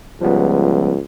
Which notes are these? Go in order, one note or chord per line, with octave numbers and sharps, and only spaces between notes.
C#2 F3 G3 B3